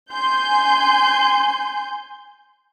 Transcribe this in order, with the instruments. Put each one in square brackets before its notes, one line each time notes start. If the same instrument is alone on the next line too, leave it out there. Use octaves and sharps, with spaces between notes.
[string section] G#5 C6 G6